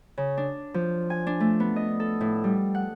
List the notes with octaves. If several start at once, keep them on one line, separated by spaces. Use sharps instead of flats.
C#3
D4
F3
G#5
D4
A3
B3
D#5
A4
A2
G3
F#5